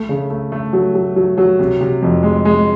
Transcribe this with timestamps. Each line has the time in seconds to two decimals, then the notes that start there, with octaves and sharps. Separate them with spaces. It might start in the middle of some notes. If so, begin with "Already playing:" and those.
Already playing: A3
0.09 C#3
0.30 A3
0.52 A3
0.73 F#3
0.95 F#3
1.16 F#3
1.38 F#3
1.59 C3
1.81 C3
2.02 F2
2.23 G#3
2.45 G#3